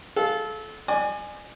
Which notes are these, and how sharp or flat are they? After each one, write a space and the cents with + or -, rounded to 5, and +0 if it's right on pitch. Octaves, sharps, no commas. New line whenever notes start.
A4 -25 F5 +0
D5 +40 G#5 +0